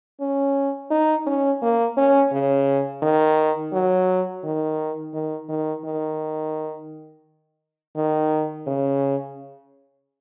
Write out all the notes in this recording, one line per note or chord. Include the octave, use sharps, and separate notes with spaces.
C#4
D#4
C#4
A#3
C#4
C#3
D#3
F#3
D#3
D#3
D#3
D#3
D#3
C#3